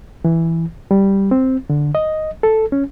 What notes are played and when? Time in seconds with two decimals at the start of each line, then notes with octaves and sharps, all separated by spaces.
0.25 E3
0.91 G3
1.31 C4
1.70 D3
1.95 D#5
2.43 A4
2.72 C#4